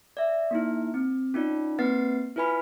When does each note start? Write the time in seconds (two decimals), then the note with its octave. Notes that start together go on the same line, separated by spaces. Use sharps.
0.17 D5 E5
0.51 A#3 D#4 E4
0.94 C4
1.34 C#4 D#4 F4 D5
1.78 A#3 C4 B4 F#5 A6 C7
2.36 E4 F4 B4 G#5 B5 B6